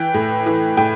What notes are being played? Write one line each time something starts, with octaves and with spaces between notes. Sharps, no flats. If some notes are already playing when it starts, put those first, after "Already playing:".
Already playing: E3 G5
A2
E3
A2 G5